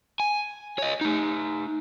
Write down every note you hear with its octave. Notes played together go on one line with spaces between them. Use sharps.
G#5
C#5 D#5
A3 D#4